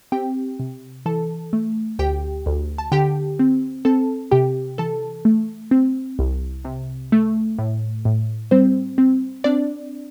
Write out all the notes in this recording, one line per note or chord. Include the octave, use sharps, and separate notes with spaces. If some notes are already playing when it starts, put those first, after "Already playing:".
C4 G4 G5
C3
E3 A4 A5
A3
D2 G4 G5
D2
A5
D3 G4 G5
C4
C4 A4 A5
C3 G4 G5
E3 A4 A5
A3
C4
C2
C3
A3
A2
A2
G3 C4 C5
C4
C4 D4 D5